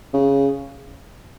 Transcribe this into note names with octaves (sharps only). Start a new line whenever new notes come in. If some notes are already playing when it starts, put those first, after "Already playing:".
C#3